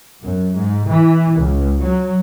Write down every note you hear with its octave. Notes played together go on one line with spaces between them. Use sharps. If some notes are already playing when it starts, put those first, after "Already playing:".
F#2
G#2
E3
C#2
F#3